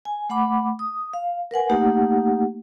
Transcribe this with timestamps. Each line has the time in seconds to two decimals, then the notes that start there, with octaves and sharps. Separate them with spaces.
0.05 G#5
0.30 A3 F#5 B5 D6
0.79 D#6
1.13 F5
1.51 A#4 B4 F#5 G#5
1.69 A3 A#3 D#4 G4 F#5